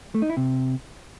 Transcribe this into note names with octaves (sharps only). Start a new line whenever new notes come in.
A3
D#4
E4
C3